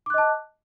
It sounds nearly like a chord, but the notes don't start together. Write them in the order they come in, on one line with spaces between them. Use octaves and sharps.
D6 F#6 D#5 A5